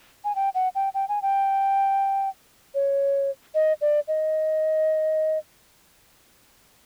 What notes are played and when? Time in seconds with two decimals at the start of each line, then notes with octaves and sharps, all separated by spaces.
0.24 G#5
0.35 G5
0.55 F#5
0.75 G5
0.94 G5
1.08 G#5
1.22 G5
2.75 C#5
3.55 D#5
3.81 D5
4.08 D#5